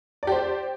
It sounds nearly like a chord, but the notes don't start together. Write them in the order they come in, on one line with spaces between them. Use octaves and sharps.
D5 G4 C5